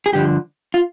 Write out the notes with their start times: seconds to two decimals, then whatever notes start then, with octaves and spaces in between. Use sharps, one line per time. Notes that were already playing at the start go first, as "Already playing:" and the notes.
0.06 G#4
0.12 G2 D3 F3 G4
0.74 F4